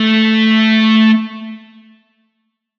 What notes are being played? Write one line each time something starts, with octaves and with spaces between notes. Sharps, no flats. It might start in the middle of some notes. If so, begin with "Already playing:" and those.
Already playing: A3